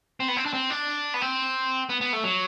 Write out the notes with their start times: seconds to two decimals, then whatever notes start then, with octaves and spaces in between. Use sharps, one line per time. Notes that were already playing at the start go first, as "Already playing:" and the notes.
0.20 C4
0.28 B3
0.36 C4
0.46 D4
0.54 C4
0.70 D4
1.14 B3
1.22 C4
1.89 B3
2.01 B3
2.13 A3
2.24 F#3